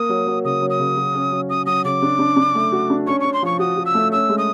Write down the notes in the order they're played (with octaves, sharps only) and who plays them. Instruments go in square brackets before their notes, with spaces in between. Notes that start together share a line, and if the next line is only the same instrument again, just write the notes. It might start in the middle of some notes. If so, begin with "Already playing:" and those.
Already playing: [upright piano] A#3 [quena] D#6
[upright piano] F#3
F#3
[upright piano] C#3 [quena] D#6
[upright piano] F#3
[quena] D#6
[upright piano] C#3
F#3
C#4
F#3
[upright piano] C#4 [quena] D#6
[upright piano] F#3 [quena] D#6
[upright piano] C#3 [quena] D6
[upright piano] D4
D4
D4
A3
F#4
D4
[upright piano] C#4 [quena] C#6
[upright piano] C#4 [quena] C#6
[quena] C6
[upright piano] F3 [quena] C#6
[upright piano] F#4 [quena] D#6
[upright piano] F#4
[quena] E6
[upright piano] A3
[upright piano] C#4 [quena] E6
[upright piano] G#3
[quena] D#6